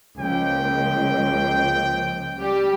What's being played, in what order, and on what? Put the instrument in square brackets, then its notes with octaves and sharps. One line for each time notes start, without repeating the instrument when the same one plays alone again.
[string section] C#2 [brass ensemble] F3 A#3 [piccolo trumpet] G5
[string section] G3 G4